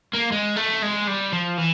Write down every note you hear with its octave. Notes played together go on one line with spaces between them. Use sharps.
A#3
G#3
A3
G#3
G3
F3
E3